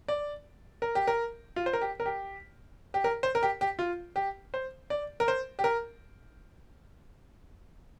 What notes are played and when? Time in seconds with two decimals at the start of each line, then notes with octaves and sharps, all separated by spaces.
0.08 D5
0.82 A#4
0.95 G4
1.07 A#4
1.56 F4
1.66 C5
1.73 A#4
1.81 G4
2.00 A#4
2.06 G4
2.94 G4
3.04 A#4
3.23 C5
3.35 A#4
3.43 G4
3.61 G4
3.79 F4
4.16 G4
4.54 C5
4.90 D5
5.20 A#4
5.28 C5
5.59 G4
5.64 A#4